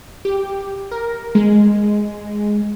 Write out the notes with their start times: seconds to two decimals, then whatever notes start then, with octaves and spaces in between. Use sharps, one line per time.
0.25 G4
0.91 A#4
1.35 G#3